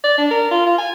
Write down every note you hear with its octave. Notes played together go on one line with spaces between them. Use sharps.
D5
D4
A#4
F4
F4
G#5